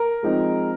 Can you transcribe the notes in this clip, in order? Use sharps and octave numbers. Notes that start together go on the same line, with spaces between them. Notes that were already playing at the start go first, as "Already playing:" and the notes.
Already playing: A#4
F3 G#3 C4 D#4